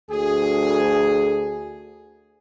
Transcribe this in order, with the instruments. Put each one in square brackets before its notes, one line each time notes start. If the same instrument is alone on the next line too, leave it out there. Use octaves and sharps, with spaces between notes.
[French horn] D2 [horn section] G#4